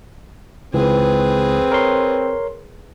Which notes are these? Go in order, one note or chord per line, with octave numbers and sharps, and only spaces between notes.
C#2 E3 C4 G#4 B4
A#4 C#5 C6